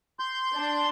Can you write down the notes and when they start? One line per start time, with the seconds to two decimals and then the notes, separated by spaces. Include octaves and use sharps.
0.20 C6 G6
0.55 D4